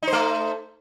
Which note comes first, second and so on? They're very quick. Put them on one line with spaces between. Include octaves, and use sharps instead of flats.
D#4 C5 A3